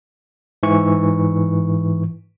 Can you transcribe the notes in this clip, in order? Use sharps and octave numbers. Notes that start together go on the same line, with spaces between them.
G#2 E3 C#6